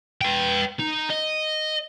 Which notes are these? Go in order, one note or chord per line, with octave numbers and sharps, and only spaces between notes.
B4 G5
D#4
D#5